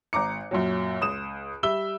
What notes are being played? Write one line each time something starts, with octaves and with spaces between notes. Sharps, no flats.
G#1 A#5 D6 C#7
F#2 A#2 F#3
C#2 D#6 E7
G3 E5 E6 G7